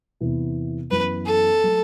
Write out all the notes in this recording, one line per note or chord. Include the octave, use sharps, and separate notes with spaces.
E2 C3 E3 B3 E4
F#2 E3 B3 B4
A4
F#3 A3